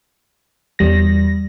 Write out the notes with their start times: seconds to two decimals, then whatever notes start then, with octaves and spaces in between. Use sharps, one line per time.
0.79 E2 G3 A#6